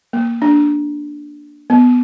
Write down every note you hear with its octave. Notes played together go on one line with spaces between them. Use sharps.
A#3
D4
B3